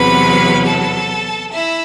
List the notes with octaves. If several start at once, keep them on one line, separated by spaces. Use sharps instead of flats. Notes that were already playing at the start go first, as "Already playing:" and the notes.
Already playing: E2 C3 F#3 B4 B5
A4 A5
E4 E5